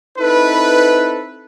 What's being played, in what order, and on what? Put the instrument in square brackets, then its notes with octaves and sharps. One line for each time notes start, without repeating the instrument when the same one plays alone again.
[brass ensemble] C4 D#4 E4 A4 B4